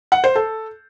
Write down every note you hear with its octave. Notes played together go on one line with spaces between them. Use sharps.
F#5
C5
A4